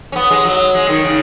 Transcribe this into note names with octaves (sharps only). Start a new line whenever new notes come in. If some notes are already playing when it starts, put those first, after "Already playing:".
C#4
B3
G#3
F#3
G#3
D#3
C#3